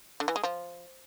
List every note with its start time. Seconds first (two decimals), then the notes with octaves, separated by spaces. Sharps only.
0.20 D3
0.28 E3
0.36 G#3
0.43 F3